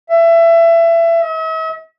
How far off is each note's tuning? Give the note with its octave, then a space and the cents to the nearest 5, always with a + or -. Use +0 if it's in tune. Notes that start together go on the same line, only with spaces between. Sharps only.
E5 +25
E5 -45